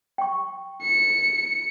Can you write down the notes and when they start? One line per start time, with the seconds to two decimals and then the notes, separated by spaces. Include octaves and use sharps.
0.18 G5 C#6
0.82 C#7